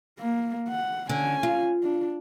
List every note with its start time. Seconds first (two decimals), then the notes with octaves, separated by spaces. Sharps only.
0.19 A#3
0.69 F#5
1.09 D3 C#4 G#5
1.43 F4
1.83 D4